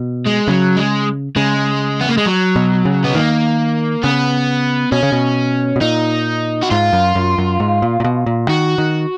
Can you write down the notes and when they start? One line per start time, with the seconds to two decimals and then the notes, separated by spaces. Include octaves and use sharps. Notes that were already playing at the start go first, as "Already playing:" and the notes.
Already playing: B2
0.26 G#3
0.48 C#3 F#3
0.77 G#3
1.36 C#3 G#3
2.01 B3
2.09 A#3
2.17 G#3
2.26 F#3
2.56 B2
2.85 C#3
3.04 B3
3.15 D#3 A#3
4.04 C#3 B3
4.92 B2 C#4
5.03 C#3
5.12 B2
5.76 B2
5.81 A#2 D#4
6.63 F#4
6.71 G#2 F4
6.93 F#2
7.15 F#2
7.38 F#2
7.60 G#2
7.82 A#2
8.00 A#2
8.04 B2
8.26 A#2
8.48 D#3 F#4
8.78 D#3